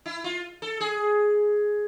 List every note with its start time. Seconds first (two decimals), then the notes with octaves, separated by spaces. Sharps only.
0.06 E4
0.24 F4
0.62 A4
0.81 G#4